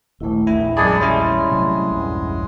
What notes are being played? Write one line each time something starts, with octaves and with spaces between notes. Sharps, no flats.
A#1 D#2 A3 E4
D#1 A#1 E2 E4 E5
F#2 G#3 G#4 D5 G#5 A5 B5
G3 G#3 C#4 E4
C3 F#3 A3
A#1 E2 G2